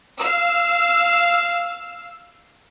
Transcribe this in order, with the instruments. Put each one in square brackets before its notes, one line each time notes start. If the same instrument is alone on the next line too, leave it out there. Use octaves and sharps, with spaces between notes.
[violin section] F5 E6